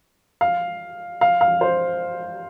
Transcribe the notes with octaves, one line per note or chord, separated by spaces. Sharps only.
F5
F5
F5
C5